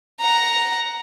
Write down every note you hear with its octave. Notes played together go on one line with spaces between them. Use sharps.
F#5 A#5